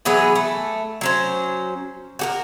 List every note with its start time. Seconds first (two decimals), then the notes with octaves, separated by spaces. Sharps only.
0.05 E3 F#3 B3 G#4
0.36 A3
1.01 F#3 C#4 C5
2.19 F#4 G4 A#4